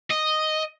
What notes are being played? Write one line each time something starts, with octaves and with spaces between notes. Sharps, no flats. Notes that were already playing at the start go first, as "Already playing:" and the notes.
D#5